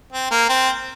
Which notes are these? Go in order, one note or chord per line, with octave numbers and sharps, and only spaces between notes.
C4
A#3
C4